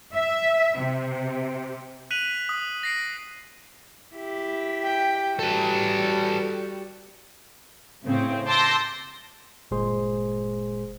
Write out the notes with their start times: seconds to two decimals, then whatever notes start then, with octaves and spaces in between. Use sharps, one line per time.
0.14 E5
0.77 C3
2.11 F#6 B6 D#7 F7 F#7
2.49 D#6
2.83 A#6 C7 D7
4.15 E4 G4
4.84 G5
5.39 G3 F#4 A4 B4
8.04 A2 C#3 C4
8.47 A5 C6 D6 E6 G6 A#6
9.71 G1 A#2 G#3 G#4 C5 C6